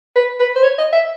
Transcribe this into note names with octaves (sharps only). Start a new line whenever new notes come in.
B4
B4
C5
C#5
D#5
E5